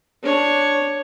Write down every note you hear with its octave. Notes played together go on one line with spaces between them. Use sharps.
D4 C#5